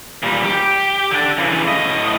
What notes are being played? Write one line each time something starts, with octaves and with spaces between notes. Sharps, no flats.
A#2 G3
G4
D3 D4
C#3 E3
A2 D#5